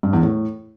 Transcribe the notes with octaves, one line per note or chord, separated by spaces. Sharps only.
G2
E2
A2